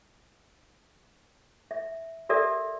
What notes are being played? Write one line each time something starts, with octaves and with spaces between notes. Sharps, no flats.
E5
G4 A4 A#4 D5 E5